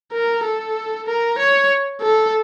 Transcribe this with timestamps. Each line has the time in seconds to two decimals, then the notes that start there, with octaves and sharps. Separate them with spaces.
0.13 A#4
0.44 A4
1.08 A#4
1.39 C#5
2.02 A4